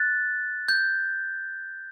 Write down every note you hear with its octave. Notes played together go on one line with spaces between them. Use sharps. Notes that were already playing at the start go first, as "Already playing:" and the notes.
Already playing: F#6 A6
G6